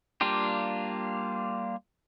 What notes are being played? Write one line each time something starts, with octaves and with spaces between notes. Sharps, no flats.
G3 A#3 D4 F4 G4